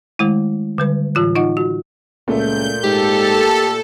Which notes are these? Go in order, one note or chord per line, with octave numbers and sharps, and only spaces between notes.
D#3 G#3 A3 E4
D3 G3 B4
A2 E3 F4 F#6
D#4 F4 D#5 F#5
F#4
C#2 A#2 A3 G6
G#2 G4 A4